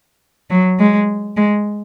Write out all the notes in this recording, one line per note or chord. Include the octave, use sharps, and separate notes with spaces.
F#3
G#3
G#3